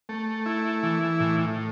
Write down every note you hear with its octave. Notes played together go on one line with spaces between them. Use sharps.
A3
E4
E3
A2